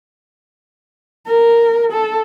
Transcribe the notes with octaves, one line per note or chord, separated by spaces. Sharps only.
A#4
A4